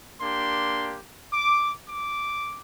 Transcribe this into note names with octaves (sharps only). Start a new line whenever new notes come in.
A#3 D4 G4 C6
D6
D6